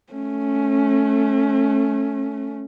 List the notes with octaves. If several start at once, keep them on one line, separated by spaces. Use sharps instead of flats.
A3 C#4